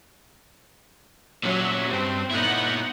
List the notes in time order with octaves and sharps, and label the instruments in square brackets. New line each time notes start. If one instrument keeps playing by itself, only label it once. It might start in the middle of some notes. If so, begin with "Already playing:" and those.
[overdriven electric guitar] A#2 C#4 [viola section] F#3 E5
[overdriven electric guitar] G2 [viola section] C4
[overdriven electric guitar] A#2 E4 [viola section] B3 D#4 F#5